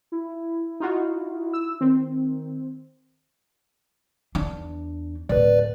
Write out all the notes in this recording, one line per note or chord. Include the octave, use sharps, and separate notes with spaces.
E4
D#4 F4 F#4
E6
D#3 C4
E2 D4
D1 B4 D5